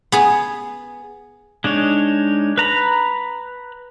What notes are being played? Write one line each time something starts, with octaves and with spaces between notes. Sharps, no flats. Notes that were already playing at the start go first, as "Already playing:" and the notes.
B3 G#4
G#3 D4 D#4 C#5
B4 A#5 B5